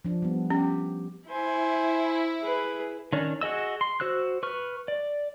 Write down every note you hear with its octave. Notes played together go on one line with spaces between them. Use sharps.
F3 D4
G3 B3
C#4 G4
E4 C5 G#5
G#4 B4
D#3 C#4 D4
F#4 G#4 D#5 E6
C6
F#4 C5 E6 F#6
B4 C#6 F6
D5